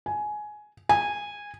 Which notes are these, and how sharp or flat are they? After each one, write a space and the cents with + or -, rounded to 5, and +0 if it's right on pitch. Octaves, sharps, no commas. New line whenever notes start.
G#5 +15
G#5 -15